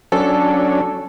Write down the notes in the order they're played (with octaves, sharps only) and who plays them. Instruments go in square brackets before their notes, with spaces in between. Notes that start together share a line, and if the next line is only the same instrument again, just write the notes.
[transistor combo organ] F#3 C#4 D4 [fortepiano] A4